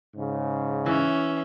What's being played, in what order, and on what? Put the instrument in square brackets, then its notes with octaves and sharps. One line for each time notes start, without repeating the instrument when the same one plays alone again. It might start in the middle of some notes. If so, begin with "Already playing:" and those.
[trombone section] G#2 C#3
[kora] E3 [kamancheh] C#4 E5